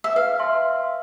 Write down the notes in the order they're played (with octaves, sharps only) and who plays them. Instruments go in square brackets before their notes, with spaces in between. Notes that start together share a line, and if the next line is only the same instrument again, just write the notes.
[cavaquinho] E5
[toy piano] B4 [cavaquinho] F5
[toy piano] E5 A5 C6